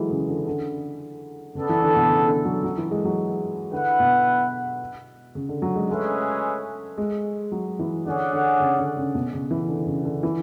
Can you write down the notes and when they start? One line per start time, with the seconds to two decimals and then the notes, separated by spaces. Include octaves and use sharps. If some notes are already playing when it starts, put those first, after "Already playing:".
Already playing: E3 F#3 G#3 A3
0.10 C#3
0.28 D3
0.47 D3
1.55 C#3 B3 D4 A4
1.69 E3
1.82 D3
1.96 B2
2.10 C#3
2.27 D3
2.45 F#3
2.64 F#3
2.78 E3
2.91 G#3
3.05 F#3
3.72 D3 E4 B4 F#5
4.00 B2
5.35 C#3
5.49 D3
5.62 F#3
5.76 G#3
5.89 G#3 A3 C#4 G#4 B4 E5
6.98 G#3
7.52 F#3
7.79 E3
8.06 D3 C#4 G#4 D5 F#5
8.33 D3
8.60 C#3
8.78 D3
8.97 C#3
9.15 B2
9.33 C#3
9.51 E3
9.69 D3
9.87 C#3
10.05 D3
10.23 E3